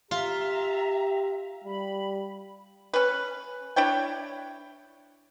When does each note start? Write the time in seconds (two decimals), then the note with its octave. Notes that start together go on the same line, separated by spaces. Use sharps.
0.11 F4 G4 E5 A#5
1.64 G3 B5
2.93 C#4 B4
3.76 D4 E4 C#5 G5